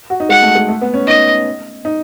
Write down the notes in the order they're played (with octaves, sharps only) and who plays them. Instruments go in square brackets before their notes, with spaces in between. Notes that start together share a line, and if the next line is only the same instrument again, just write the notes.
[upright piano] F#4
D#4
[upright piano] G#3 [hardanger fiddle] F#5
[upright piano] A3
G#3
A3
B3
C#4
[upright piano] D#4 [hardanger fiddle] D#5
[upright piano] D#4